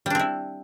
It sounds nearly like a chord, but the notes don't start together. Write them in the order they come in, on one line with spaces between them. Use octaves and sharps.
G3 D4 C4 E4